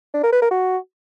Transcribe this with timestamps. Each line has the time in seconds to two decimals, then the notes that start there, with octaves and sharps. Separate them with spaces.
0.14 D4
0.23 A#4
0.33 B4
0.42 A#4
0.51 F#4